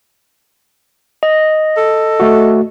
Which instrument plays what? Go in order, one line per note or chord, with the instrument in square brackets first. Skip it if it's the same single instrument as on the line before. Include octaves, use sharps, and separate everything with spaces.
[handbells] D#5
[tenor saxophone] A4
[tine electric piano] A3 F#4